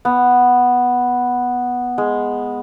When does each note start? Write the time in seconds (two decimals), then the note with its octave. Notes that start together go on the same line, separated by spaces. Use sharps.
0.05 B3
1.98 G#3